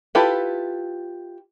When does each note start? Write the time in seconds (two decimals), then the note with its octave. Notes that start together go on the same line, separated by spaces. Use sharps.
0.15 E4 F4 G4 A4 B4